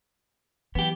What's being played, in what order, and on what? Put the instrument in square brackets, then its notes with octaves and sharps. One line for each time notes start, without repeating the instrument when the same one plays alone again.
[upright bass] E3 F#3 [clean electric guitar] B3 G4